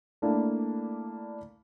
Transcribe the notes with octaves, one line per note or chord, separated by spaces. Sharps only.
A3 A#3 D4 E4